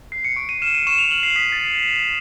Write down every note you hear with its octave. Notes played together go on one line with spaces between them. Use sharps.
F#6 C7
C#7
C#6 D7
D#7
F6 E7
D#7
C#6 E7
F7
F6 F#7
C7
D#6 B6
A6